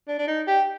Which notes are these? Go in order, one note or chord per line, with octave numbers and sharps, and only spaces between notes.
D4
D4
D#4
G4